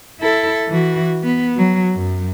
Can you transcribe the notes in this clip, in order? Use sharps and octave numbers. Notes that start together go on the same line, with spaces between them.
E4 A4
E3 F#4
B3
F#3
F#2